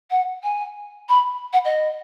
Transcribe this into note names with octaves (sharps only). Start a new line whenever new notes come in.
F#5
G#5
B5
F#5
D#5